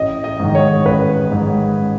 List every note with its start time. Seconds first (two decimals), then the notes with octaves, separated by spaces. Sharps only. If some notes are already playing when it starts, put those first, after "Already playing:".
Already playing: A1 D#5
0.24 D#5
0.40 G#2 D#3
0.55 C#5
0.85 A1 B4
1.32 G#2 D#3